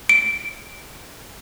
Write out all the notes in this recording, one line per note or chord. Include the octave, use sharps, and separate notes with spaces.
D7